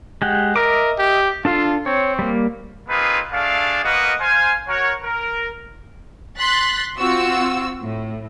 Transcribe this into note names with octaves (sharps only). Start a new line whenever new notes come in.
G#3 G4 F#5
A#4 D#5 E5 D6
G4
D4 F4 A4 F5
C4 C#5
G3 A#3
A#3 C4 D#4 F4 G#4 B4
A3 D4 G#4 D5 F5
A#3 F#4 A#4 B4 D#5
C5 F5 G#5
F#4 A#4 C#5
A#4
C6 F#6 A6 B6
C4 F4 F#4 E6
A2